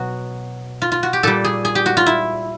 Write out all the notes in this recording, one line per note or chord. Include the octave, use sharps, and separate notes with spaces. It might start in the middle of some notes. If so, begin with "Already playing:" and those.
Already playing: B2 F#3 F#4
F4
F4
F#4
G4
A#2 G3 A4
G#4
G#4
G4
F#4
F4
E4